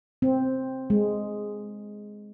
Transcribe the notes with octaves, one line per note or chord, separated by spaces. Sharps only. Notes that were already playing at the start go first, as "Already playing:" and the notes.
C4
G#3